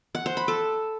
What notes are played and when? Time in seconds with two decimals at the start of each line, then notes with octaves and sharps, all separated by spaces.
0.15 F#5
0.26 C5
0.37 B5
0.48 A4